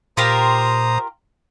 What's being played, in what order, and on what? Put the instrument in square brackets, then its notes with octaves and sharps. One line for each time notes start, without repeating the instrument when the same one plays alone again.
[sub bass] A#2 [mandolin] F4 G4 A#4 [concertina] C5 A#5 D#6